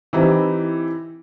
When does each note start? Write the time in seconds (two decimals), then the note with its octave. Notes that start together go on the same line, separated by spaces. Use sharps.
0.13 E3 C4 D#4 E4 G4